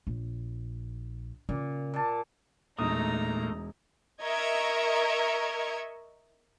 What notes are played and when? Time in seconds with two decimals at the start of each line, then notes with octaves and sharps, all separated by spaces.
0.07 A#1
1.49 A#2 C#3
1.94 A#2 A5
2.79 E1 A#2 A3 D#4 A#5 D#6
4.23 A#4 D#5 E5 C#6 G#6